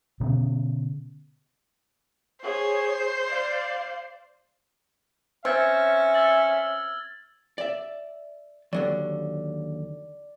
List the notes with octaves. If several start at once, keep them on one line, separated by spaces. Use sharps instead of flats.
B2 D3 B3 C#4
G#4 C5 C#5
D5 F5
C4 C#4 E5 F6 G#6 A6
E6 A6 F#7
D5 E5
D#2 D3 F#3 D5